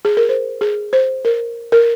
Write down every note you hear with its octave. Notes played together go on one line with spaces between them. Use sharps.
G#4
A#4
C5
G#4
C5
A#4
A#4